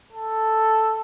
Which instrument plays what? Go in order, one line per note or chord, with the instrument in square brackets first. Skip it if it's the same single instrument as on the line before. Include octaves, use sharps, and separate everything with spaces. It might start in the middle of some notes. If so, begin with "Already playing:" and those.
[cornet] A4